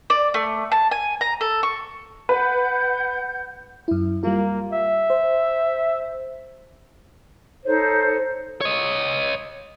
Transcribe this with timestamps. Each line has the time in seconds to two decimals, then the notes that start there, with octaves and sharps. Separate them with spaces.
0.10 D5
0.34 A3
0.72 A5
0.91 G#5
1.21 A#5
1.41 A4
1.63 C#6
2.29 B4 F#5 G6
3.88 F#2 E4
4.23 G3 A#3 F4
4.73 E5
5.10 C5
7.65 D#4 A4 C5 C#5
8.61 C#5 D#5